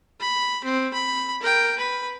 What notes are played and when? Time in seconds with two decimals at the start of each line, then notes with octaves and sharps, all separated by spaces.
0.21 B5
0.64 C4
0.94 B5
1.42 A#4 G5
1.79 B4 B5